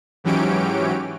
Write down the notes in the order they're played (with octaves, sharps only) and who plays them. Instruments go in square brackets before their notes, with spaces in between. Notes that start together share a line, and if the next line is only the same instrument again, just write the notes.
[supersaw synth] G#2 E3 F#3 C#4 G4 D7